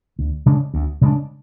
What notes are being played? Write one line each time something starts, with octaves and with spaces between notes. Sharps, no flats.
D2
C#3 G#3 D4
D2
C#3 G#3 D4